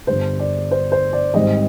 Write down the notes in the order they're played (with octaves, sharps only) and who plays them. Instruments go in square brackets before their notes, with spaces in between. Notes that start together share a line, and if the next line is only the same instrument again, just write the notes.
[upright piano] G1 G2 D3 C5
D5
C5
C5
D5
G#1 G#2 G3 C4 D#5